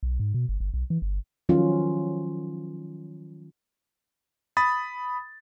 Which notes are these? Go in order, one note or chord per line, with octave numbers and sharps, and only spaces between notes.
B1
G#2
B2
G1
G1
B1
E3
G1
D#3 F3 F#3 C#4 F4
B5 D#6 A6